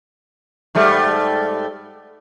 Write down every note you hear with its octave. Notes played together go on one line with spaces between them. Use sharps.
G#2 G3 A3